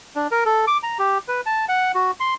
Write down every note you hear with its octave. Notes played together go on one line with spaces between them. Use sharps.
D4
A#4
A4
D6
A#5
G4
B4
A5
F#5
F#4
C6